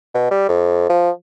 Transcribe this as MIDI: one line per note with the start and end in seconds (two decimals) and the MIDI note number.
0.14 0.27 47
0.31 0.46 55
0.49 0.89 41
0.90 1.10 53